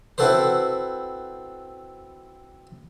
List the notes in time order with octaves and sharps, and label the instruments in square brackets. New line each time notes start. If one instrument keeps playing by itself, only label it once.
[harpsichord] C4 E4 F#4 A4 B4 C5